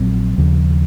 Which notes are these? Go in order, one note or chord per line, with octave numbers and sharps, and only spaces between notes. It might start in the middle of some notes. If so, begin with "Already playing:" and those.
Already playing: A#1 A#2 F#3 C4
D#2 C#3 F3